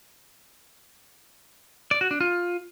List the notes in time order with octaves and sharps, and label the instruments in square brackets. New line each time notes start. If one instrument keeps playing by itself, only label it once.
[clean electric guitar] D5
F#4
D4
F4